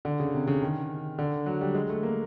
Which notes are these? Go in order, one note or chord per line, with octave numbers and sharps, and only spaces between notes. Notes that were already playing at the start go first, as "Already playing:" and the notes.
D3
C#3
C3
C#3
D#3
D3
F#3
G3
G#3
A3
A#3